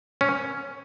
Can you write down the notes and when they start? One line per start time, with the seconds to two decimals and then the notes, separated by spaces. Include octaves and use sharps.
0.21 C#4